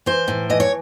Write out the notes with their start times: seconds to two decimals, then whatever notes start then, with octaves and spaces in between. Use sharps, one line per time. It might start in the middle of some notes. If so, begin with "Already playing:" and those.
0.06 E3 C5
0.28 A2
0.50 E3 D#5
0.60 C#5